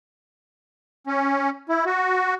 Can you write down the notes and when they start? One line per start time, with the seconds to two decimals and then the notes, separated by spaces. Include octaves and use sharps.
1.07 C#4
1.69 E4
1.86 F#4